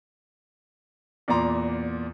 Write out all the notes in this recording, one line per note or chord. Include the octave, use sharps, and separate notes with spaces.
E2 A#2 D5 A#5 C6